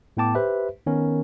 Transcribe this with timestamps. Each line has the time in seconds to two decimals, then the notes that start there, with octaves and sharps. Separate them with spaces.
0.17 A2 B3 G5 A5 D6
0.35 G4 B4 C5 E5
0.86 D#3 B3 C#4 A#4